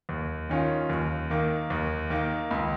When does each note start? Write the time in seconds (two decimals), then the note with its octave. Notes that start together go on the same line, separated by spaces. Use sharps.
0.09 D#2
0.49 D#3 C#4 F4
0.90 D#2
1.30 D#3 A#3
1.70 D#2
2.10 D#3 A#3
2.51 C#2